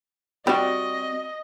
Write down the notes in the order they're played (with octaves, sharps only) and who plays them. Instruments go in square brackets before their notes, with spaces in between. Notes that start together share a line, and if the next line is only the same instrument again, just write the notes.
[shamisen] G3 [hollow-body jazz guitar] C4 F#4 [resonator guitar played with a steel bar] D5 [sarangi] D#5